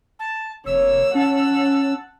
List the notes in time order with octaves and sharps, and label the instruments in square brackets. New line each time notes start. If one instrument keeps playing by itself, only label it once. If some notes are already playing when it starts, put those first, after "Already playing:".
[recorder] A5
[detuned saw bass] F1 [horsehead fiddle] A#3 C#5 [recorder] E6
[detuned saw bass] C#4 [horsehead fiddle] F#5 A5